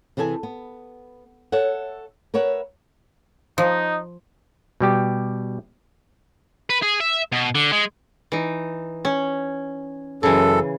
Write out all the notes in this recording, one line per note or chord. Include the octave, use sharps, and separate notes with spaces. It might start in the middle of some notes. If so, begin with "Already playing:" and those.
C3 E3 G#4 A4 G#5
B3
A4 C#5 E5 F#5
A#4 B4 C#5 E5 F#5
F3 D#4
B2 G3 G4
B4
G#4
E5
B2
D3
G#3
E3 D#4
C#4
F#2 C#3 E3 A4